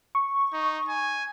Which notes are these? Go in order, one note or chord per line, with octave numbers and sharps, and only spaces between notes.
C#6
D#4
G#5